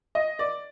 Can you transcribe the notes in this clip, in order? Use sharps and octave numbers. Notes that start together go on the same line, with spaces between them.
D#5
D5